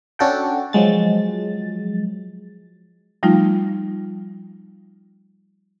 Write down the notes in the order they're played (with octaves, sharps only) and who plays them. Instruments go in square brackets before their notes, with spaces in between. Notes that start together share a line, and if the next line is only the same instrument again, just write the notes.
[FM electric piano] C#4 D4 F#4 A4 F#5 G5
F3 F#3 G#3 A6
[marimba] F3 G3 A3 D#4 F4